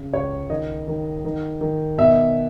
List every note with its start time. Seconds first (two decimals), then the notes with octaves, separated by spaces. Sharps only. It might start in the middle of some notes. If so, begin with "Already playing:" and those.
Already playing: C#3
0.13 C#2 C#5
0.50 D#3 D#5
0.88 D#3
1.25 D#3
1.61 D#3
1.98 B2 E5